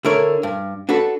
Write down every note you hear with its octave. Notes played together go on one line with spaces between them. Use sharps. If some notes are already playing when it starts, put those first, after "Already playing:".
D3 E4 A#4 C#5
G2
D4 F#4 A4 B4